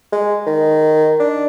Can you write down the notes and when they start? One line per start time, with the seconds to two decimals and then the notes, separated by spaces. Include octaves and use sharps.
0.12 G#3
0.47 D#3
1.20 D4